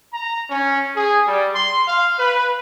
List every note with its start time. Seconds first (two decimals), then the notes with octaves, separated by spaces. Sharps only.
0.14 A#5
0.49 C#4
0.95 G#4
1.26 G3
1.55 C6
1.88 F5
2.19 B4